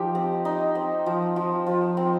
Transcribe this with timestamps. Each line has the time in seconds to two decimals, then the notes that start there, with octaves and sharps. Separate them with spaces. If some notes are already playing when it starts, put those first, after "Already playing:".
Already playing: F3 D#4 G4
0.15 C4
0.45 D#4
0.75 C4
1.06 F3
1.36 F3
1.66 F3
1.97 C4